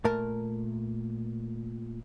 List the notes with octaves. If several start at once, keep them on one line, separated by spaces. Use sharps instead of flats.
A#2 A3 A#4 A5